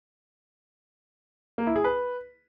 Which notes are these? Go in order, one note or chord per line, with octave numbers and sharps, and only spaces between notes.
A#3
E4
G#4
B4